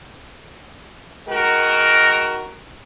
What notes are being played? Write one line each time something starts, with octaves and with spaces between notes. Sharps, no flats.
D#3 G#3 F#4 A#4